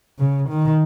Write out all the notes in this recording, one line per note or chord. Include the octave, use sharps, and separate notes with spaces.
C#3
D#3